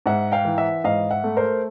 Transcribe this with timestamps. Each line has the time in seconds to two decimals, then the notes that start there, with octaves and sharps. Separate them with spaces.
0.06 G#2 E5 F#5
0.32 F5 G5
0.45 E3
0.58 E5 F#5
0.84 G#2 D#5 F5
1.11 E5 F#5
1.24 A3
1.37 A#4 C5